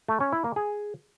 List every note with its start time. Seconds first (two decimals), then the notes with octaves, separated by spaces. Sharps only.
0.08 A3
0.20 C#4
0.32 E4
0.44 A#3
0.56 G#4